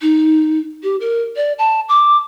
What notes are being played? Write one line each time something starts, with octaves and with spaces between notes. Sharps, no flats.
D#4
G4
A#4
D5
A5
D6